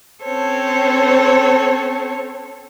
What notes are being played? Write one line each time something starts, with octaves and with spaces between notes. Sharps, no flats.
C4 C#4 A4 C5 C#5